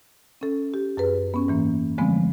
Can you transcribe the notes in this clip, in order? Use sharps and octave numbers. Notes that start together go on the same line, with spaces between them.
C#4 A4
G4
F#2 G#4 B4
B3 C#4
G#2 E3 A#3
D3 F3 G#3 A3 B3 C4